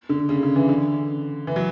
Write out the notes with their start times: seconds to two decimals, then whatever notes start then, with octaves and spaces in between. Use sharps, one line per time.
0.09 D3
0.29 C#3
0.43 D3
0.56 E3
0.69 D3
1.47 E3
1.56 F#3